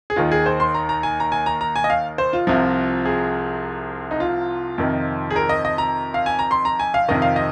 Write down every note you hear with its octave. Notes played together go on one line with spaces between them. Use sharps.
G#4
D#2 D#3 F4
G#4
C5
C6
A#5
A#5
G#5
A#5
G#5
A#5
A#5
G#5
D#5
F5
C5
F4
C2 C3 F3 F4
G#4
D#4
F4
F2 C3 D#3
G#4
A#4
D#5
D#5
A#5
F5
G#5
A#5
C6
A#5
G#5
F5
F2 C3 D#3 D#5
F5
D#5